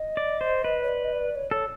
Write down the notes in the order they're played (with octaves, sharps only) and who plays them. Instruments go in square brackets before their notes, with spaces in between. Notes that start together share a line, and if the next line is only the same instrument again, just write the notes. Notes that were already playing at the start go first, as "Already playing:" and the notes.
Already playing: [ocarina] D#5
[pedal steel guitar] D5
C5
B4
[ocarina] C#5
D5
D#5
D5
C#5
[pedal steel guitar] A4 [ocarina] C#5